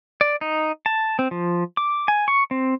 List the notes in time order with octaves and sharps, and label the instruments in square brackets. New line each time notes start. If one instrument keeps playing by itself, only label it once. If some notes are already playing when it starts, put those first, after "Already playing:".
[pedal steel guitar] D5
D#4
A5
C4
F3
D6
G#5
C#6
C4